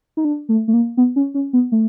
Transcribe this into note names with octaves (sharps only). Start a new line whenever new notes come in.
D#4
D4
A3
A3
A#3
B3
C#4
C#4
B3
A3